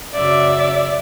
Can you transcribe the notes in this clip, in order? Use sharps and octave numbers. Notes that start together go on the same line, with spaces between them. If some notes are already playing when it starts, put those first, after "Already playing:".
F#2 C#3 F#3 D5 E5